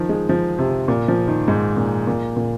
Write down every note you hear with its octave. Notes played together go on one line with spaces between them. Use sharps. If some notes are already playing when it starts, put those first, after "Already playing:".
Already playing: D#3 F3
G#3
F3
C3
A#2
F3
D#3
G#2
A#2
A#2
A#2